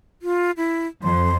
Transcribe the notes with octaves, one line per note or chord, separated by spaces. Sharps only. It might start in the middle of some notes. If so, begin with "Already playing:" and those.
F4
E4
F2 C6